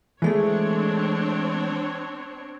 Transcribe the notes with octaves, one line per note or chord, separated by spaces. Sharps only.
E3 G#3 A3 C4 D4 C#5